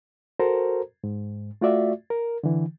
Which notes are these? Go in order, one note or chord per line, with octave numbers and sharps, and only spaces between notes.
F#4 A4 A#4 C5 A#5
G#2
A3 F4 F#4 D5 E5
A#4
D3 E3